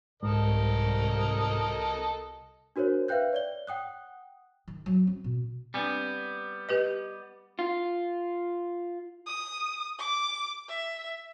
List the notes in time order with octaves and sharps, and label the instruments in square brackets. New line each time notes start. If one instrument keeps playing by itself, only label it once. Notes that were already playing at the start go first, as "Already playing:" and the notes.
[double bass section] C2 [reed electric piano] G#2 [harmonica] A4 A#4 D#5
[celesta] D4 F#4 A#4 C5 C#5
B4 E5 F5 G5 F#6 G6
C#5 D5 G7
F#5 G5 D#6 F#6
[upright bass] D#3
F#3
C4
B2
[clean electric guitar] G3 B3 [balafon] C4 D4
[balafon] G4 B4 D#5
[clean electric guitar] F4
[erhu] D#6
D6
E5